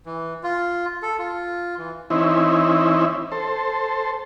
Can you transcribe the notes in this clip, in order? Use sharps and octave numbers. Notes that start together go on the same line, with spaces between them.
E3
F4
A4
F4
E3
E3 C4 C#4 D#4 E4
A4 C5